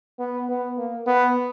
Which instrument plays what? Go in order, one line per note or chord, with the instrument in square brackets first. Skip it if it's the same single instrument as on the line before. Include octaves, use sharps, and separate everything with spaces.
[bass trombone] B3
B3
A#3
B3